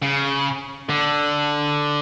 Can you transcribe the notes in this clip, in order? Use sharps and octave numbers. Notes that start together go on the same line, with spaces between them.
C#3
D3